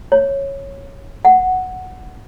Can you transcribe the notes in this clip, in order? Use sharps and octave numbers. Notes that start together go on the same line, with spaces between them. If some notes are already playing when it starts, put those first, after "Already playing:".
C#5
F#5